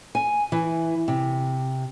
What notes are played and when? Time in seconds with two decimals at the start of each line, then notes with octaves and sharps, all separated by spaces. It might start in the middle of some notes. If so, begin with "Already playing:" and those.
0.15 G#5
0.52 E3
1.08 C3